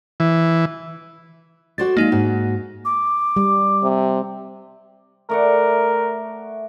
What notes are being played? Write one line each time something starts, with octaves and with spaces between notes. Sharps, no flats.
E3
F#4 C5 D5 A6
G#3 A#3 D#4 F5 A#6
G#2 F#4
D6
G3
C3
A3 A#4 D5 F#5